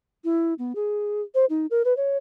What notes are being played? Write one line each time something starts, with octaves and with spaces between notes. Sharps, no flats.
E4
B3
G#4
C5
D#4
A#4
B4
C#5